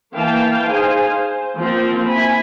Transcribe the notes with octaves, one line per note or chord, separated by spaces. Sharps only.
E3 A#3 F5 G5 A5
D#4 G#4 C5 F5 G#5
C5
F3 A#3 C4 F4
E4 G#5 B5